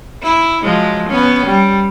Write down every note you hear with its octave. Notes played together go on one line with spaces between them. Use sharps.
E4
F3 F#3 G#3
B3 C#4
G3